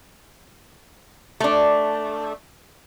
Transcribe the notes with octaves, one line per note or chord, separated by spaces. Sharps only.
A3 D4